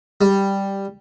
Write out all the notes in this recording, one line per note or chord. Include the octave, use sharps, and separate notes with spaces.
G3